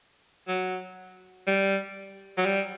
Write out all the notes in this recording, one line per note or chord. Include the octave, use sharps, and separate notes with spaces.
F#3
G3
F#3
G3